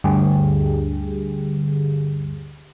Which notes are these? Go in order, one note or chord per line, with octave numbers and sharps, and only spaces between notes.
D2 G2 D3 G4 G#4